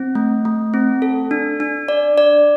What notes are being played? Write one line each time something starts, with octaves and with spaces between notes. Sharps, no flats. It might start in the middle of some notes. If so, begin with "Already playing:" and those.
Already playing: C4
A3
A3
C4
A4
D4
D4
D5
D5